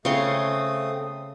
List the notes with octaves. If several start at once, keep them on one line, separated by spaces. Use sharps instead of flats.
C#3 A3 C4 C#5 C6 D#6